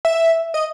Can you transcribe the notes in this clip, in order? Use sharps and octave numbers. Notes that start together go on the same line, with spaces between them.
E5
D#5